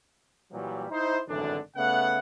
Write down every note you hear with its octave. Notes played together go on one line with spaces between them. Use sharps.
A#2 E3 F#3 G3
D#4 E4 C5
G#1 F#2 A2 D3 E3 D4
C#3 A3 B3 E5 F#5